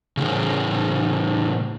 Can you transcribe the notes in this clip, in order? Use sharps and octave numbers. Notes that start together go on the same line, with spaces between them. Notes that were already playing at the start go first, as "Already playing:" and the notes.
A2 C#3